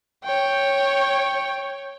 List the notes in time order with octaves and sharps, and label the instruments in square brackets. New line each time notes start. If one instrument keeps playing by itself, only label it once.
[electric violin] C#5 G5